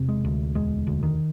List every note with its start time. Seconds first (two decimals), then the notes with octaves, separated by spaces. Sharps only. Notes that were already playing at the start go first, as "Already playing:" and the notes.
Already playing: E1 C3
0.08 G#3
0.25 D2
0.55 E1 G#3
0.87 D2
1.03 D#3